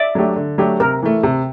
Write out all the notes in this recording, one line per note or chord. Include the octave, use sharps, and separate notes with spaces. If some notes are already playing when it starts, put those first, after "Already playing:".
Already playing: D5 E5
F#3 A3 D4 G4
D3
F#3 A3 D4 G4
C3 A#4
E3 A3
C3